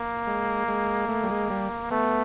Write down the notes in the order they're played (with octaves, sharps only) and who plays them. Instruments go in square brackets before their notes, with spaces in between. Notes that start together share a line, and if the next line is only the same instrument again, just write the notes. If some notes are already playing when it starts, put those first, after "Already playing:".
Already playing: [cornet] A#3
[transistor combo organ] G#3
G#3
A3
G3
G#3
G3
[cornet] A3 [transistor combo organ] B3